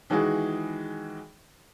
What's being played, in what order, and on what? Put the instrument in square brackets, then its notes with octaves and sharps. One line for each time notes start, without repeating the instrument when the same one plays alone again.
[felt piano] D#3 E3 G#3 F#4 G#4